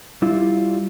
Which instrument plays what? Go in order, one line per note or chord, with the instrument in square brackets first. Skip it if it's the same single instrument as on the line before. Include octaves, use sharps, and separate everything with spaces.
[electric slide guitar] G3 E4 F4